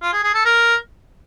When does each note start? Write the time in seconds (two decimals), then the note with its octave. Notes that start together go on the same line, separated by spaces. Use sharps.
0.02 F4
0.13 G#4
0.23 G#4
0.34 A4
0.45 A#4